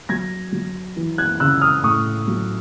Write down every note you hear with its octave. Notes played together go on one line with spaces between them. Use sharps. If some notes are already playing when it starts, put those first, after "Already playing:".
F#3 G#6 A#6
F#3
E3
F#6 G#6
C#3 E6 F#6
D#6 F6
A2 C#6 D#6
F#3